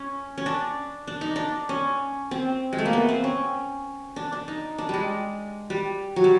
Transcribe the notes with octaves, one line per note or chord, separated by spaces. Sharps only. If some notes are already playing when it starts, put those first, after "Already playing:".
Already playing: C#4
C#4
D4
D4
D#4
D4
C#4
C4
G#3
A3
A#3
B3
C4
C#4
D4
D4
D#4
D4
G3 G#3
G3
F#3
G3